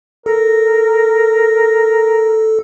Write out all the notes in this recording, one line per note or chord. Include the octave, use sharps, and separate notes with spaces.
A4 A#4